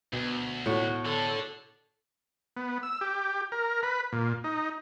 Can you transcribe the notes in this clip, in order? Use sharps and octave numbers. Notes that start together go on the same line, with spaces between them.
D2 B2
A2 F#4
D3 A4
B3
E6
G4
A#4
B4
A#2
D#4